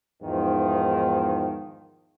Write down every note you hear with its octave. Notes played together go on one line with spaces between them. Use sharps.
E2 G#2 D#3 F3